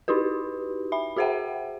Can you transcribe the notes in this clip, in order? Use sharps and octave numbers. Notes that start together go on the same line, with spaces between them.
D#4 E4 F#4 G4 B4
E5 B5
F#4 G#4 C5 E5 F#5 G5